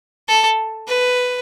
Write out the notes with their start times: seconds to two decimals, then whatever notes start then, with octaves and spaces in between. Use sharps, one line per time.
0.28 A4
0.87 B4